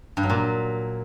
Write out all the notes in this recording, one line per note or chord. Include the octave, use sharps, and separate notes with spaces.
G2
F#3
A#2